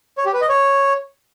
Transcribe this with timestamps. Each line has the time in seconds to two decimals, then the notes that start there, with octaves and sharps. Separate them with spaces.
0.18 C#5
0.26 G4
0.33 B4
0.41 D#5
0.49 C#5